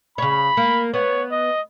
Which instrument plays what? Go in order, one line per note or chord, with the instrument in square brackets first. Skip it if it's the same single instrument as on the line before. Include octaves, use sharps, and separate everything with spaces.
[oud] C#3 C#5 [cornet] B5
[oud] A#3
[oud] B3 [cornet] C#5
[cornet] D#5